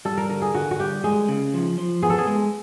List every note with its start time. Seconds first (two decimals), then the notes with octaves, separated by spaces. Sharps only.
0.05 G3 A4
0.17 A#4
0.29 D3 A#4
0.42 G#4
0.55 D3 F#4
0.71 F#4
0.80 G3 G4
1.04 G#3 G#4
1.29 C#3
1.54 F3
1.78 F3
2.03 B3 G#4
2.10 A4
2.18 G#4
2.27 G#3